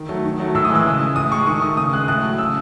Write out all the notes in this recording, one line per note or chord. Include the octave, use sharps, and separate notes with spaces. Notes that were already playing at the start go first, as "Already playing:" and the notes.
Already playing: D#3
F#3 A3
D#3
F#3 A3
A2 E6
D#6
E3 G#3 E6
C#3
G#3
A2 D#6
G#3 C#6
D#3 C#6
A3 D#6
C#3 D#6
G#3 F#6
A2 F#6
F#3 A3
C#3 E6